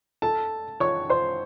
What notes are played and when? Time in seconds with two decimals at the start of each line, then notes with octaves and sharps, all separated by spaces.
0.22 A4 A5
0.80 C#5 C#6
1.10 C5 C6